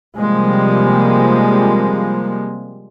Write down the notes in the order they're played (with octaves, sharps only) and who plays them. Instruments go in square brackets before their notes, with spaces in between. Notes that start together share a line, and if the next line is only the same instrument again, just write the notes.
[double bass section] C3 F3 G3 G#3 A#3